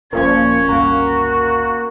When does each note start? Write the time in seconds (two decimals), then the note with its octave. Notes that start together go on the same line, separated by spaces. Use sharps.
0.13 D#1 A#1 A#2 F3 C#4 C#6 G#6
0.69 G1 C#2 A#3 F#4